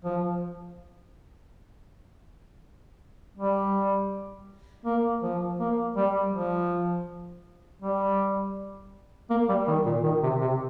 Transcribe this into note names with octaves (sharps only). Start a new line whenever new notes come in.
F3
G3
A#3
F3
A#3
G3
F3
G3
A#3
G3
D#3
A#2
D#3
C3
C3